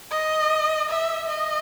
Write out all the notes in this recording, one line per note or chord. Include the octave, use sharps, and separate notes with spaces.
D#5
E5
D#5